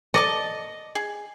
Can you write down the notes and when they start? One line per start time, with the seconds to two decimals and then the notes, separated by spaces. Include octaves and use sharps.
0.14 A4 D5 D#5 A5
0.95 G#4